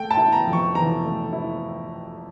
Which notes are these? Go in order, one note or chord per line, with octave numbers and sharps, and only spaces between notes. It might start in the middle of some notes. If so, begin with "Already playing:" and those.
Already playing: A3 G5
A5
E4
A#5
F2
C#6
E3 A#5
A3
E4